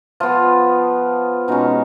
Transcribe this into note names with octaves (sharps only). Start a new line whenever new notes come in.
F3 B3 F4
B2 G#3 C#4 D#4